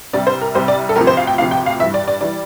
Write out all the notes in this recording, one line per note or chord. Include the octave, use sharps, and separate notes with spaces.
C2 C3 G3 D5
C5
A#4
C2 C3 G3 C5
D5
A4
D2 C3 F3 A#4
C5
F5
G5
D2 C3 F3 F5
G5
F5
G2 E3 G3 E5
D5
D5
E3 G3 D5